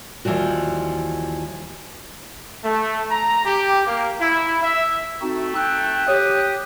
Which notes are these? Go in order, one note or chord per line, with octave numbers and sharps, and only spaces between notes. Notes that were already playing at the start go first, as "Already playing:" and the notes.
D#2 E3 F3 G3 F#4
A3
A#5
G4
A#3
E4
E5
A3 C4 D#4 F#4
G5 E6 F#6
G4 C#5 D#6